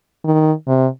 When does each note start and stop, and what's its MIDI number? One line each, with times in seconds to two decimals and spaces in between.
0.24 0.52 51
0.67 0.87 48